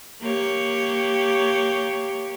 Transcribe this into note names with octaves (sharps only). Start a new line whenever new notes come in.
A#3 G4 C#5